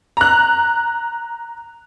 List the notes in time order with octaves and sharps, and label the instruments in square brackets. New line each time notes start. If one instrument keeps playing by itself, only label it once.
[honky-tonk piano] A#5 F#6